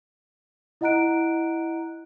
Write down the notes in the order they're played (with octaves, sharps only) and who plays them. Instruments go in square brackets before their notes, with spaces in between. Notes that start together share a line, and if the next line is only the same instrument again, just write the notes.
[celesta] E4 D#5 F#5 A#5 F#6 D7